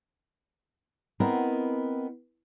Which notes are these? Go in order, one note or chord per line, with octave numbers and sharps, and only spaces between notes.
B3 C4 E4 A#4 D#5